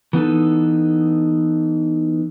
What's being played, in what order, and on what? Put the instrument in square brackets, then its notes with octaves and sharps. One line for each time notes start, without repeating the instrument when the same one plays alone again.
[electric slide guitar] E3 B3 D#4 A4